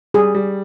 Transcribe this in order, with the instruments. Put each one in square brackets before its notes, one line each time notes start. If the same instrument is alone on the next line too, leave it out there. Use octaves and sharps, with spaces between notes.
[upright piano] G3 [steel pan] G#4
[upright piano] G3